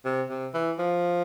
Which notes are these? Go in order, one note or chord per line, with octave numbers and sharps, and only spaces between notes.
C3
C3
E3
F3